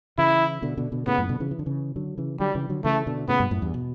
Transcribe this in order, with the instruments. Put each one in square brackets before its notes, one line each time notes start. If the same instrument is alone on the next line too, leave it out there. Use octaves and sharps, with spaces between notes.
[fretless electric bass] C#3 E3 [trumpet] E4
[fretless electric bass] B2 D3
B2 D3
B2 D3
[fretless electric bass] A2 C#3 [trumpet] B3
[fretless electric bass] F#2 A2
B2 D3
C#3 E3
E3
D3
C#3 E3
D3 F#3
C#3 E3
[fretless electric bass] D3 F#3 [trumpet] G3
[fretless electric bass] C#3 E3
D3 F#3
[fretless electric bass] C#3 E3 [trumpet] A3
[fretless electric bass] B2 D3
[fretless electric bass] A2 C#3 [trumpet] B3
[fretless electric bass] G2 B2
F#2 A2
E2 G2
B2